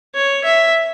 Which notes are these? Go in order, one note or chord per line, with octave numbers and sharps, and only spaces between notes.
C#5
E5